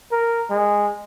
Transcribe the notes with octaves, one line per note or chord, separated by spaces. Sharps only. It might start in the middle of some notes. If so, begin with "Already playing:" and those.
A#4
G#3